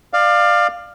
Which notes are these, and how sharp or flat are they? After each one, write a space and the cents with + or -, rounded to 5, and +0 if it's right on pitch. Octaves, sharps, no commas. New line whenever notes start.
D5 +25 F5 +0